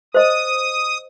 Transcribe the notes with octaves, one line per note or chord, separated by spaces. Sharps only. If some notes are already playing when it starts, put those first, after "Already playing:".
C5 D#5 D#6